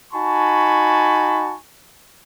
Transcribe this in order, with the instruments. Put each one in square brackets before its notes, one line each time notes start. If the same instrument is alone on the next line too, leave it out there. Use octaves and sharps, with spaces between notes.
[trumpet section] D#4 F#4 G#5 A5 B5 C#6